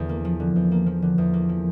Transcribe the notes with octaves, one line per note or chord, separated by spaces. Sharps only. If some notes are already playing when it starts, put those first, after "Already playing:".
Already playing: E2 D3
A#3
F3
D3
E2
A#3
F3
D3
E2
A#3
F3